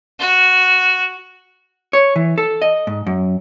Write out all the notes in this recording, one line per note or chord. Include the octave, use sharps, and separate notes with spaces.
F#4
C#5
E3
A4
D#5
G#2
F#2